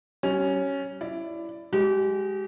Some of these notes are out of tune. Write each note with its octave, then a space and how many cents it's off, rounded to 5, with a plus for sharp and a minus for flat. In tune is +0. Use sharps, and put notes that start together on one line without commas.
G3 -40 C#4 +0
E4 +15 D5 +0
G#3 +0 G4 -30